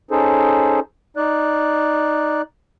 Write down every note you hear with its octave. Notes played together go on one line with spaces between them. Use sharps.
C#4 D#4 G#4 A4 C5
D#4 D5 F#6